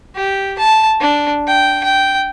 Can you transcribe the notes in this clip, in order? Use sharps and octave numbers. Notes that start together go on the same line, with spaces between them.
G4
A5
D4
G5
G5